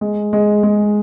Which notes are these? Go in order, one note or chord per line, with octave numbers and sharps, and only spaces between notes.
G#3
G#3
G#3